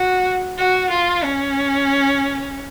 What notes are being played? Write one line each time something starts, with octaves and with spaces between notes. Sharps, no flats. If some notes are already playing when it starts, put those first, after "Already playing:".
Already playing: F#4
F#4
F4
C#4